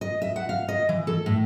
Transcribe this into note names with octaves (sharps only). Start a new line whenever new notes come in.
D#5
E5
F#5
F5
D#5
E3
A4
A2